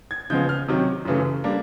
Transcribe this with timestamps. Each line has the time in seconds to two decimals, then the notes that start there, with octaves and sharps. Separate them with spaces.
0.11 G#6
0.30 C#3 F3 G#3 B3 G6
0.49 F6
0.68 C3 D#3 F#3
1.05 F#2 C#3 E3 A3
1.44 G3 A#3 D4